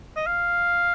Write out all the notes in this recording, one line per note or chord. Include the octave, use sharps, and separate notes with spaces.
D#5
F5